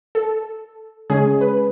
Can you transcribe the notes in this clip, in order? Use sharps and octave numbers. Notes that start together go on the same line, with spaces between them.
A4
C#3 G#3 C#4 G#4
B4